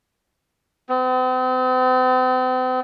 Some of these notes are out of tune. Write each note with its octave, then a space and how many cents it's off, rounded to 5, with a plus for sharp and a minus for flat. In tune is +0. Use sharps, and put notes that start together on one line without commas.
C4 -40